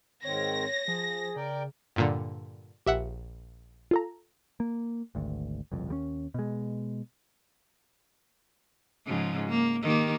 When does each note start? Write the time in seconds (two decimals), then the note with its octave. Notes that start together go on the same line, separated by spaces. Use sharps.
0.24 G#2 D#3 C4 C#5 A#6
0.88 F3 G#4
1.36 C#3 A#4 D5 G5
1.96 G2 A#2 D3
2.86 A#1 G4 E5 F#5
3.91 F4 A4 A#5
4.60 A#3
5.15 G#1 D2
5.72 F#1 C2 F2
5.88 D#2 G3 C#4
6.34 B2 G#3
9.06 G#2 C#3 F3
9.49 A#3
9.83 D#3 A#3 G4